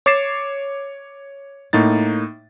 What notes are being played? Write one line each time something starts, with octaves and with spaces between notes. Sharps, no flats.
C#5 D6 A6 C7 E7
A2 A#3 D#4 A6